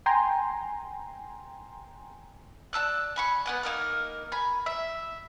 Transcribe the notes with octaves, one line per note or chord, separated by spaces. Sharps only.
G5 G#5 A#5 C6
D5 A5 E6 F#6
G#5 B5 C#6
B3 F#5 G#5
A#3 D#4 A#4
G#5 A#5 B5
E5